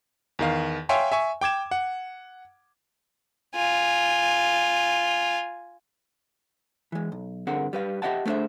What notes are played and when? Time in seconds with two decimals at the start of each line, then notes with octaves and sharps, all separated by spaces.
0.39 E2 D#3 F5
0.89 C#5 E5 F5 G5 G#5 C6
1.12 E5 G#5 C#6
1.41 G5 D6 G#6 E7
1.71 F#5
3.55 F4 G#5
6.92 E3 G#3
7.12 B1
7.47 G2 D3 C4 G#4 A#4 F#5
7.73 G3 B4 F5
8.02 G4 D#5 E5 F#5 A5
8.26 A3 B3 D4 G#4 C5 E5